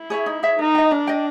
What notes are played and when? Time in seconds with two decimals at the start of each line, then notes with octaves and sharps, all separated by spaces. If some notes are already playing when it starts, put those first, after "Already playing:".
Already playing: E4
0.10 G#4 C#5 E5
0.26 D#4
0.43 G#4 C#5 E5
0.59 D#4 A#4
0.75 D#5 G5
0.91 D4 A#4
1.07 D#5 G5